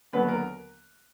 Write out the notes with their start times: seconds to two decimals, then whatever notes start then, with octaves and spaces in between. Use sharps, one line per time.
0.13 D#2 D3 F#3 B3 B4
0.28 A#4